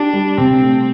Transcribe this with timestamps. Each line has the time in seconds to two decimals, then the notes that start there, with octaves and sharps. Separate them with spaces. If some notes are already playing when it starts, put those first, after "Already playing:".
Already playing: D4 G4
0.13 G3
0.38 C3 C4
0.62 A3